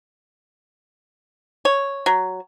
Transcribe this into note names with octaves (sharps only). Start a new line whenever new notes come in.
C#5
F#3